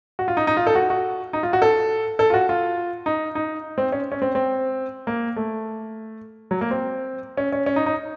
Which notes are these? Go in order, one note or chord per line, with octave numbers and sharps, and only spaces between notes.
F#4
F4
D#4
D#4
F4
A4
F#4
F#4
D#4
F4
F#4
A4
A4
F4
F#4
F4
D#4
D#4
C4
C#4
C#4
C4
C4
A#3
A3
F#3
A#3
C4
C#4
C#4
C#4
D#4
D#4